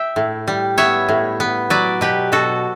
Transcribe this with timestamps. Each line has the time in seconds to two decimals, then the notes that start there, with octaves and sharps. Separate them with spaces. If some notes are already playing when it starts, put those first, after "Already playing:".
Already playing: E5 G5
0.16 A2
0.48 G3
0.78 B3 C#5 E5
1.09 A2
1.40 B3
1.70 F#3 B4 D5
2.01 B2 G4 B4
2.32 B2 F#4 A4